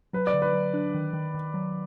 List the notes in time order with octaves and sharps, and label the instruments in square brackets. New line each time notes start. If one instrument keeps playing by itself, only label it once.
[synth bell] F#3 [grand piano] B4
[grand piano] D5
[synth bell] D3
[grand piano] B4
[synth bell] F#3
D4
D#3
D#3
D#3
F#3